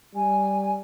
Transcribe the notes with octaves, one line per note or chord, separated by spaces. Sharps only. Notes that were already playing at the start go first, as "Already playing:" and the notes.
G3 G#5